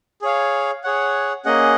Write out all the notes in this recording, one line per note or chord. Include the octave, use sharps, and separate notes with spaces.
G#4 C#5 F5
G#4 C#5 F#5
A#3 C#4 G#4 D#5 F#5